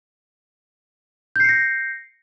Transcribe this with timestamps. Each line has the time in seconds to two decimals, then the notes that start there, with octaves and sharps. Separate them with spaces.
1.36 G6
1.40 C7
1.44 C#7
1.49 A#6